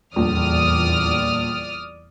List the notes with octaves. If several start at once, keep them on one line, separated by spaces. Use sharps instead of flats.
D#1 A#1 E2 D5 D#6 F6